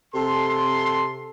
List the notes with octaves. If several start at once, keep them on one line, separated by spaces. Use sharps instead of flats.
C3 A4 C6